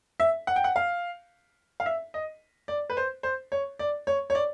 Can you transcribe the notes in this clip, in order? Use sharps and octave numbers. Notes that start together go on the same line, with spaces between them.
E5
F#5
G5
F#5
F5
F5
E5
D#5
D5
B4
C5
C5
C#5
D5
C#5
C#5
D5